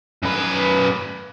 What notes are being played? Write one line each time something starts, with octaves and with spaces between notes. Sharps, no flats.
F#2 B4